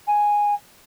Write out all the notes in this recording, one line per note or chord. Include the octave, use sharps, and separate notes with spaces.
G#5